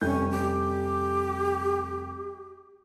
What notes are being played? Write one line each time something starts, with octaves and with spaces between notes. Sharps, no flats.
F1 G3 C#4 G6
G4